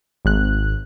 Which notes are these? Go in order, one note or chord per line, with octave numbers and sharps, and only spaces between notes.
G#1 F#6